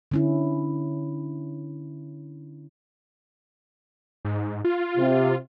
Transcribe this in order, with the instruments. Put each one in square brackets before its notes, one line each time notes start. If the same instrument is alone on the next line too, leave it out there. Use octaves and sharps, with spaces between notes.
[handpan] D3 C#4 E4
[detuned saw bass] G#2
F4
[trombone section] C3